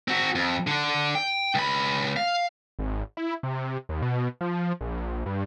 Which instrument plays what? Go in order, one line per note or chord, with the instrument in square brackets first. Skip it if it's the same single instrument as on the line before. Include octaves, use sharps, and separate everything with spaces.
[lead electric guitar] C4 F#4
F2
D3 D4
G5
C#2 B5
F5
[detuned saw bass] G#1
E4
C3
D#2
B2
F3
A#1
G2